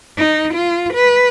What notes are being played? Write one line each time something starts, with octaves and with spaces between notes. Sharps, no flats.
D#4
F4
B4